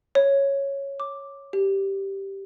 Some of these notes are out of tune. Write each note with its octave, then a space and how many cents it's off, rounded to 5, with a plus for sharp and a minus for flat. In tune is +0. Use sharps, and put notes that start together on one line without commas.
C#5 -5
D6 +0
G4 -5